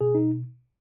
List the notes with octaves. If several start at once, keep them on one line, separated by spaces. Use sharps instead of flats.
B2 G#4
D#4